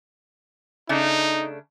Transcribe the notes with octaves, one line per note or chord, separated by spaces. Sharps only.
C#3 A3 D4 D#4